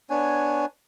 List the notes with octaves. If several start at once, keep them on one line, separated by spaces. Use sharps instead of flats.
B3 D4 C#5 G#5